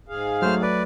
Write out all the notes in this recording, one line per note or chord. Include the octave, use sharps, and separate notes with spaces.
G#2 G#4 F5
F#3 A3 C5 F6
B4 D5